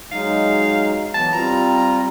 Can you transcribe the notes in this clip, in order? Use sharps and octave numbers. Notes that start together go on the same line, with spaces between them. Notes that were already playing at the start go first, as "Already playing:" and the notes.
F#3 G#3 D#4 F5
E3 F#3 B3 A5
G3 C4 F4 A#5